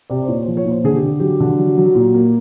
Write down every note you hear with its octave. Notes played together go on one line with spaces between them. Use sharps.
C3 D5
C5
A#2 C#5
C5
F3
C#5
A#2
C5
D3 G#4
G4
D3
F#3 G4
D3
F#3
F#3
A#2
A#3